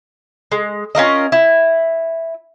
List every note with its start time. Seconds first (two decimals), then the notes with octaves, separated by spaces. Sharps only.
0.52 G#3
0.95 C#4 F4 A#4 D#5
1.32 E4